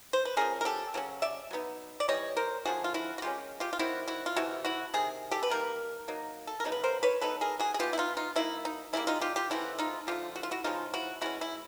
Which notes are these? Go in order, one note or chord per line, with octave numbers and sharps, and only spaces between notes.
C5
B4
F3 A3 C#4 G#4 A#4
A#4
G4 A4
C#3 F#3 C#4
D5 E5
F#3 B3 D#4
D5
E3 G3 C#5 D#5
A#4 C5
D3 F3 A3 F#4 G#4
F4
E4 F#4
F#4
D#3 G#3 C#4 F4 G4
F4 G4
F4
D#3 G3 C4 E4 F#4
E4 F#4
F4
C3 E3 A3 E4 F#4
E4 F#4
C3 D#3 G#4
G4 A4
B4
D#3 G3 A#3 A#4
F#3 A#3 D#4
A4
A#4
C#3 F#3 B3 D#4
B4
A#4 C5
B4 C#5
F#3 B3 D#4 A4 B4
G#4 A#4
F#4 G#4
G#4
B2 F#3 B3 F4 G4
E4
D#4 F4
D#4 F4
F#3 A#3 D#4 E4
D#4
C#3 E3 G3 A#3 E4
D#4 F4
F4 G4
F4 G4
C#3 E3 A3 C4 E4 F#4
D#4 F4
D3 F3 A3 F4 G4
F#4
F4
E4 F#4
C#3 F3 G#3 C#4 D#4 F4
E4 F#4
B2 G#3 C#4 E4 F#4
E4